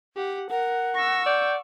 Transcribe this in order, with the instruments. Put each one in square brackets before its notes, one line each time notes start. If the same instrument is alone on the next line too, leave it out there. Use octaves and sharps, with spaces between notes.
[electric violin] G4 F#5
[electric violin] A#4 [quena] F#5
[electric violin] C#6 E6 [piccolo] A#6
[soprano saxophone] D5 [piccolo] G6